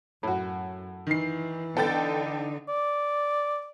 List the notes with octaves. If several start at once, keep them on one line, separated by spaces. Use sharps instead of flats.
F#2 A2 F#4
D#3 E3 C7
D3 B3 D#4 A4 G5 A6
D5